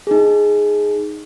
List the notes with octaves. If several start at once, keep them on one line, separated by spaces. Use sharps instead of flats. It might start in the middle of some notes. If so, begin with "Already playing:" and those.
D#4 G#4